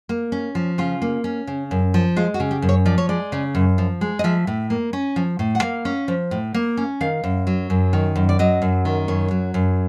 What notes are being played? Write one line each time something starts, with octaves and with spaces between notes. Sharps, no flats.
A#3
C#4
F3
C#3 F4
A#3
C#4
C#3
F#2
F3
G#3 F4
F#4
C#3
G4
F#2
C#5
F3 D5
C#5
G#3 D5
C#3
F#2
F3
G#3
D#5
F3 E5
A2
A#3
C#4
F3
A2
F#5
A#3 F5
C#4
F3
A2
A#3
C#4
D#3 F5
F#2
F#3
F#2
D#3
F#2
D5
F#3 D#5
F#2
D#3
F#2 C#5
F#3
F#2